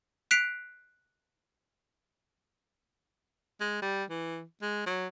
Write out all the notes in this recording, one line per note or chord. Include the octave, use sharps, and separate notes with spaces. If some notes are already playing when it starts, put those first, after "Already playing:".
F#6 B6 C7 D7 F7
G#3
G3
E3
G#3
F#3